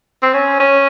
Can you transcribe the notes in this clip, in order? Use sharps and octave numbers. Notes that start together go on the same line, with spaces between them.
C4
C#4
C#4